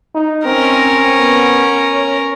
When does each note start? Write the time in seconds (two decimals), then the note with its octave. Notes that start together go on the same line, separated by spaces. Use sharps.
0.15 D#4
0.45 C4 C#4 A#4
1.18 B3
1.94 C#5